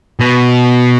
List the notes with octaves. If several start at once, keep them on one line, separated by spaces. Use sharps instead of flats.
B2